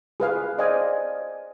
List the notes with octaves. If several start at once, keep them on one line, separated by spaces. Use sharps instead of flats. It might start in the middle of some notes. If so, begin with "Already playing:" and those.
G#4 B4 F5
C5 D5 D#5 F5 G#5